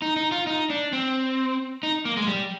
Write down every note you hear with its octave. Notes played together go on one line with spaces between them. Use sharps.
D#4
D#4
F4
D#4
D4
C4
D#4
A#3
G#3
G3